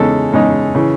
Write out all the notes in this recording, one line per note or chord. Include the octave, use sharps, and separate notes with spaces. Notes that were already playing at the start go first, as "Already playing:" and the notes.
Already playing: E2 C#3 G#3 D#4 A4
E2 C#3 G#3 D#4
C#3 E3